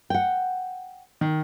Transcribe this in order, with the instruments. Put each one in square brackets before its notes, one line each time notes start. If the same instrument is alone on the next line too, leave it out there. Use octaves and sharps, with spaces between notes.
[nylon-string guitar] F#5 G5
[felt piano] D#3